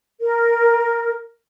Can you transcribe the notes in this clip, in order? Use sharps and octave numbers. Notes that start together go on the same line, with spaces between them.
A#4